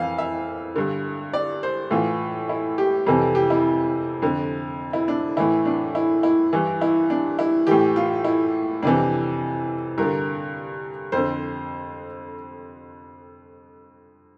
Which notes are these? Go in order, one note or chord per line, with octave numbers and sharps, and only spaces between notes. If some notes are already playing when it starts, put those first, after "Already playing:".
Already playing: F2 E3 F5
E5
G2 D3
D5
C5
A2 E3 F4
E4
G4
F2 C3 E3 A4
G4
E4
F2 D3
E4
D4
A2 E3 E4
D4
E4
E4
G2 E3
E4
D4
E4
A2 E3 G4
F4
E4
F2 C3 E3 D4
G2 D3 A#4
F2 D3 C5